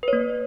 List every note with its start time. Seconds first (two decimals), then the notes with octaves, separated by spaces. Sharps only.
0.03 B4
0.08 C#5
0.13 A#3